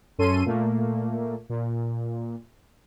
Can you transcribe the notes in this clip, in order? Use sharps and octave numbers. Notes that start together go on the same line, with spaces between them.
F#2 C#4 A4 C6 D#7
A#2 A3 A#3
A#2